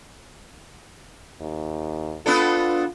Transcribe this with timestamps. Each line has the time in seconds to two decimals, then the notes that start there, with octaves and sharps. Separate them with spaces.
1.40 D#2
2.26 B3 D4 F4 A4